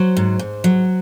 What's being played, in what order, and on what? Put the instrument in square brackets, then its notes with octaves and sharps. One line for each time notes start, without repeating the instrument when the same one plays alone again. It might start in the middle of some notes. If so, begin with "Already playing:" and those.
Already playing: [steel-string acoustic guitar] F#3 C5
G#2
G#2
F#3